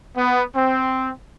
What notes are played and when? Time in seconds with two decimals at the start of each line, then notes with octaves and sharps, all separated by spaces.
0.16 B3
0.54 C4